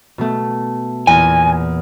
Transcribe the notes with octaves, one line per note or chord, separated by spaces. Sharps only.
B2 A3
E2 A#2 G#5 A#6